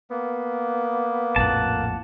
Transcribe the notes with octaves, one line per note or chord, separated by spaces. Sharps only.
A#3 B3
A#1 F2 A2 F#5 A5